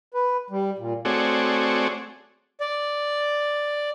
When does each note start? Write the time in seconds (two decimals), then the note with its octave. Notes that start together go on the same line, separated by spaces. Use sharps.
0.14 B4
0.50 G3
0.78 A#2
1.05 A3 C4 F#4 G#4 C#5 D5
2.60 D5